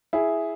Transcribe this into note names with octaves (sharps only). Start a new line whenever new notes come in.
E4 G#4